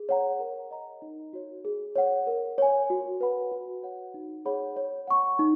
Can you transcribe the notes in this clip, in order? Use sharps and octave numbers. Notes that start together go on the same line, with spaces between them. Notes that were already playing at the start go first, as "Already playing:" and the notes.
Already playing: G#4
C#5 F#5 A#5
A#4
D#5 A#5
D#4
F#4 C#5
G#4
C#5 F#5
A#4
C#5 G#5
F#4
B4 F#5 B5
F#4
C#5 F#5
D#4
G#4 C#5 F#5 B5
C#5
F#5 C#6
D#4